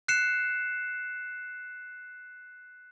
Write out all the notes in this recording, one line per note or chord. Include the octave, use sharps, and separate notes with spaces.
F#6 C7 C#7 E7